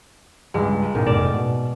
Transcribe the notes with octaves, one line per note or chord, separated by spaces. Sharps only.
C#2 G2 G#3
B1 D#3
F1 D5 E7
B2